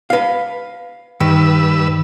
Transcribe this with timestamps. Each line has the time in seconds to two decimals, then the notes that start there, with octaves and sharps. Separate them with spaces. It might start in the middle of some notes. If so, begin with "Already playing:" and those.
0.10 B4 F5
1.20 G2 D#3 B4 E6